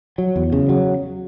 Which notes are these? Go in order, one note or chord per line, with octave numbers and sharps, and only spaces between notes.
F#3
E2
C#3
F#3